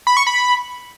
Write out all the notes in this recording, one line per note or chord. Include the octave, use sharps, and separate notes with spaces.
B5
C#6
B5